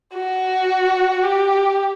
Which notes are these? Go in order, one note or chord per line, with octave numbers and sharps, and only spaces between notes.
F#4
G4